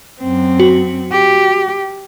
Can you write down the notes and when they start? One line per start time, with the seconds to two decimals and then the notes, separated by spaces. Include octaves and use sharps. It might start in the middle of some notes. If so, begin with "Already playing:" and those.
0.20 F#2 C4
0.60 F#4
1.11 G4